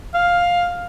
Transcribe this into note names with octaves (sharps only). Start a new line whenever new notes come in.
F5